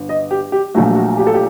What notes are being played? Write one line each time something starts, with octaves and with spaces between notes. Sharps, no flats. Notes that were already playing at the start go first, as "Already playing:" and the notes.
Already playing: G1
D#5
G4
G4
A#1 A#2 F#3 A3 F#4
F#4
G4
A4
G4